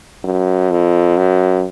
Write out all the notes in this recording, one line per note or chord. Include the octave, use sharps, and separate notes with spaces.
F#2
F2
F#2